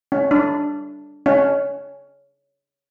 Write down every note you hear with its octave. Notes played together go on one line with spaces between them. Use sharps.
C#4
D4
C#4